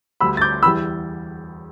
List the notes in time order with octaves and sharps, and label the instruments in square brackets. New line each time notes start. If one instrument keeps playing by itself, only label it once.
[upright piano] D2 D3 G3 B5 E6
A6
D6 G6
E2 E3 G3 B5 E6